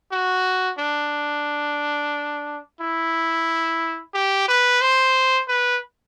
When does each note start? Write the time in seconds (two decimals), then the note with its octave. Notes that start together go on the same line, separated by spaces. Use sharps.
0.12 F#4
0.79 D4
2.81 E4
4.14 G4
4.48 B4
4.82 C5
5.48 B4